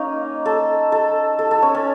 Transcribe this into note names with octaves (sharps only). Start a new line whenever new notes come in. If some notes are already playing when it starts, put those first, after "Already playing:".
Already playing: A#3 C#4 D#4
A4
A4
A4
A4
C#4
C#4